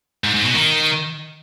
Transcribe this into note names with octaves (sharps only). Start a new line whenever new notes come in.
G#2
G#2
B2
D#3